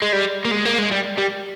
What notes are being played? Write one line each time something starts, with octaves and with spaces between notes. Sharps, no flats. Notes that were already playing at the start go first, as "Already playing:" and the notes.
G#3
G3
A#3
G#3
A#3
G#3
G3
G3